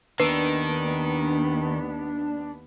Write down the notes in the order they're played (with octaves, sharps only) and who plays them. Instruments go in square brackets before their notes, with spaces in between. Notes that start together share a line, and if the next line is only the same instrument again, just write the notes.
[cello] D#2 B3 [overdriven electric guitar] D#3 [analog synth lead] D4 [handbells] B4